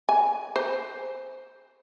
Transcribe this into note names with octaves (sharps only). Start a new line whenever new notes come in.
G#5
C5